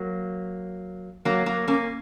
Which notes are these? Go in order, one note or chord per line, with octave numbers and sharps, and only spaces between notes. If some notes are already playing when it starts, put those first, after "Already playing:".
Already playing: F#3 A#3
F#3 A#3
F#3 A#3
A#3 C#4